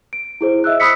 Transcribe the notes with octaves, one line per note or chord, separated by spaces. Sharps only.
D7
E4 G#4 C5
D#5 E5 E6 F#6
B5 D#6 E6 B6 C#7